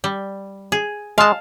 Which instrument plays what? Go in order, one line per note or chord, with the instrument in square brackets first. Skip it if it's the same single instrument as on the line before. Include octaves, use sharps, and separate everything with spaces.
[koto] G3
G#4
[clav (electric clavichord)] G#3 [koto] F5 A5